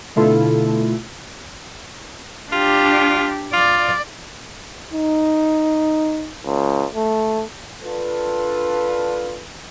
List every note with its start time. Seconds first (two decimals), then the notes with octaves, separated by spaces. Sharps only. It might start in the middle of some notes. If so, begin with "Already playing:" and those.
0.16 B2 D3 A3 E4 F4 A4
2.52 D4 F4 G4
3.53 F4 D5
4.93 D#4
6.45 C#2
6.94 A3
7.83 D4 F4 A4 B4